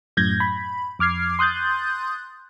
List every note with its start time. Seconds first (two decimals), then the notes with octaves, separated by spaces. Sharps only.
0.17 F#2 A2 G6 G#6 A#6
0.40 B5
0.99 F2 D6 F6 G#6 C7
1.39 C6 D#6 F#6 G6 A6